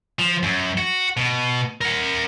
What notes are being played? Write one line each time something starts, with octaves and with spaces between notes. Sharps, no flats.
F3
F#2
F#4
B2
A#4 F#5